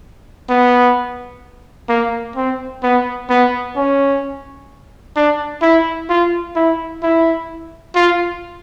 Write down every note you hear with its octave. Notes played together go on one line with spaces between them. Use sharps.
B3
A#3
C4
B3
B3
C#4
D4
E4
F4
E4
E4
F4